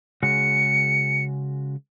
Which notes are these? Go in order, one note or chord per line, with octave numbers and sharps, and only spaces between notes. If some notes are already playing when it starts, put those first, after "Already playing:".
C#3 G#3 F#4 C#7